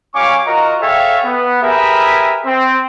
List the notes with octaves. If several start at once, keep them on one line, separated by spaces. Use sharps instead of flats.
G3 C#4 F5 G#5 C#6 D6
F4 F#4 A#4 D#5 A#5
G#4 A4 C#5 E5 F5 G5
B3
G4 G#4 A#4 B4 E5
C4